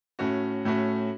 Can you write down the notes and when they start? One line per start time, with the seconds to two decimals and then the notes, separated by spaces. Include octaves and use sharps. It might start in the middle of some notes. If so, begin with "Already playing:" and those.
0.19 A2 A3 C#4 F#4
0.65 A2 A3 C#4 F#4